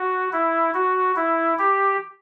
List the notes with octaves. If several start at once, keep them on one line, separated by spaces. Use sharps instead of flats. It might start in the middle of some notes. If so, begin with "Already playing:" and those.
Already playing: F#4
E4
F#4
E4
G4